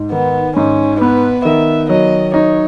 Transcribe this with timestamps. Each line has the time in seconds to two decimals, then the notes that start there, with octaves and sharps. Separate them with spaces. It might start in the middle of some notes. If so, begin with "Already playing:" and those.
Already playing: G#2
0.12 D#3 B3
0.56 G#2 C#4
1.00 B3 B4
1.45 D#3 E5
1.89 F#3 D#5
2.34 D#4 C#5